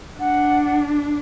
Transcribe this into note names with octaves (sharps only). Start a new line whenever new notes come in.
D4 F#5